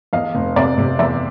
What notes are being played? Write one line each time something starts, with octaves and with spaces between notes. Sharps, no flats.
E2 D#5 F5
F1
C3 D5 E5
C3
E2 D5 E5